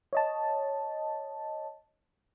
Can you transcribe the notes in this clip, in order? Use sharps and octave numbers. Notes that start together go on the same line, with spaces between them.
C#5 D#5 A5